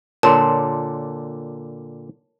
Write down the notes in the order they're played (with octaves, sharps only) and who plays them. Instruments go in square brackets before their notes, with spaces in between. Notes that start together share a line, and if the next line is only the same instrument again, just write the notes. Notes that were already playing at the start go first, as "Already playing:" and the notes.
[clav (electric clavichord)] A#2 D3 [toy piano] A#4 C#5 C6 [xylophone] A5